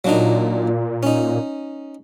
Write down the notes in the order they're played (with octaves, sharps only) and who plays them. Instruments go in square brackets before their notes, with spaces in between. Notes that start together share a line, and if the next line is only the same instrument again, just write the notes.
[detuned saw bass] A#2 [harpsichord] F#3 D4 D#4
[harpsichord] C#4 D#4